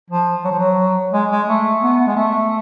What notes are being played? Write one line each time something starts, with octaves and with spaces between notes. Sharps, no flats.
F3
F#3
F3
F#3
G#3
G#3
A3
B3
G#3
A3